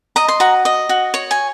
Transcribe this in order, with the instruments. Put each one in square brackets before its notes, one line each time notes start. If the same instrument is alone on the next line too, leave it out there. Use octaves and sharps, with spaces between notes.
[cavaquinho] D#5 A#5
C6
F#4 A#5
D#5
F#4
C#5
G#5